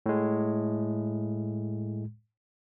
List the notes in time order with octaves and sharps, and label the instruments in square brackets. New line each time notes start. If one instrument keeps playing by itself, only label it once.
[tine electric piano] A2 G#3